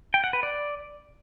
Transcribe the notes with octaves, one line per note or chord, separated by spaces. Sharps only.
G5
F#5
B4
D5